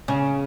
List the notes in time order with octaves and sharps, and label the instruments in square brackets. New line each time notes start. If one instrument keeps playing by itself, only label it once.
[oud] C#3 [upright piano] C#4